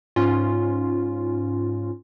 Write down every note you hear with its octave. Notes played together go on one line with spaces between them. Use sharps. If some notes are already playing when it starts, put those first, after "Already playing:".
G#2 C#4 F4